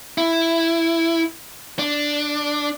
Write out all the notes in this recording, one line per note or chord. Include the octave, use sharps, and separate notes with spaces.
E4
D4